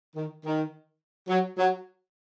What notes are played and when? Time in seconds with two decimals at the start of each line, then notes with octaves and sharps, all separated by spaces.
0.16 D#3
0.44 D#3
1.29 F#3
1.57 F#3